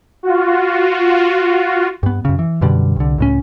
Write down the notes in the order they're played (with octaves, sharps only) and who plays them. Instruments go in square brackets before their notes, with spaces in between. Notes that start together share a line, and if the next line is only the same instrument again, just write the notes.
[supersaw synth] F4 F#4
[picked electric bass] G2 B3
F#2 C#3
E3
F#2 B2 D3 G3
C2 D3
C#2 A2 C#4